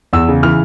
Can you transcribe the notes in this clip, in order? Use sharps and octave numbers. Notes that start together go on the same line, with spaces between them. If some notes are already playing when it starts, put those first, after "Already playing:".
E2 E6
C#3
E3 F6